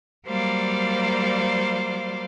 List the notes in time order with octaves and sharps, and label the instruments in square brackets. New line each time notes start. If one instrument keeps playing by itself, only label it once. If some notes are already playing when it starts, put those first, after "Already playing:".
[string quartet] F#3 G3 A#3 C5 D5 F5